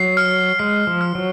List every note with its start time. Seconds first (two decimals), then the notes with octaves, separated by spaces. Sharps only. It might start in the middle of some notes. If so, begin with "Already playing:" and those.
Already playing: F#3 C7
0.17 F6
0.59 G#3 C7
0.87 F3
1.01 F6
1.15 F#3